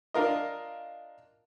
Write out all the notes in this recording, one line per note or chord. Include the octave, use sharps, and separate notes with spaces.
D4 F4 A#4 D#5